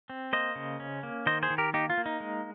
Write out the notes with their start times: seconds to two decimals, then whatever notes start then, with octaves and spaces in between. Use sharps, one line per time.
0.10 C4
0.33 A#3 C5 D#5
0.56 C#3
0.80 C#4
1.03 A#3
1.26 D#3 C5 D#5
1.43 G#4 C5
1.50 D#3
1.58 G4 A#4
1.74 A#3 D#4 G4
1.90 F4
1.98 A#3
2.06 D#4
2.20 G#3